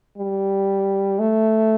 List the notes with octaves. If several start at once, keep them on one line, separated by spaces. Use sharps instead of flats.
G3
A3